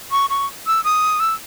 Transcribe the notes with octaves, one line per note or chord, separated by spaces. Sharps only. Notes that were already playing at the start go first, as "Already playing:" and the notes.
C#6
C#6
E6
D#6
E6